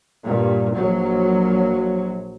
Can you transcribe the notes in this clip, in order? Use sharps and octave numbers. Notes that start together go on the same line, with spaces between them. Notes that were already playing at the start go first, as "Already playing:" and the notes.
G2 A#2
A#1 F#3